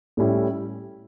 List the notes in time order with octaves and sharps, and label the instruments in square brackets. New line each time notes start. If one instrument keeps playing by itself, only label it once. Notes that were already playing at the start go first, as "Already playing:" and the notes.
[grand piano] A2 G3 C#4 E4